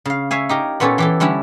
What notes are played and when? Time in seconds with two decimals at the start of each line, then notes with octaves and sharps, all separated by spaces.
0.05 C#3 F5
0.31 C#5 E5 F5 G#5
0.49 D#4 G4 A#4
0.80 A#2 B3 C#4 A4 C#5 D5
0.98 E3 G4 A4
1.20 D3 G3 C#4 E4